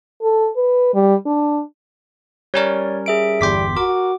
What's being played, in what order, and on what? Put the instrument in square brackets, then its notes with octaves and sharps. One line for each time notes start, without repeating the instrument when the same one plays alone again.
[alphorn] A4
B4
G3
D4
[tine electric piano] G3 C#4 A#4 [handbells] C#5 D5
[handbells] G#4 E5 D7
[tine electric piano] G1 E2 G5 [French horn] G3 [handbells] C6 D6 B6
[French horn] F#4 [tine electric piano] A#4 [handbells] D6